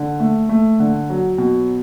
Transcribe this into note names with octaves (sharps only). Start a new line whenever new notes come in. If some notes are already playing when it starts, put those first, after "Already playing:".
Already playing: D3
A3
A3
D3
F#3
B2